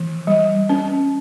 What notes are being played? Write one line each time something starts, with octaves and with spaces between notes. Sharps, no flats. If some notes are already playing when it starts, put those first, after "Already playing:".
Already playing: E3
G3
C#4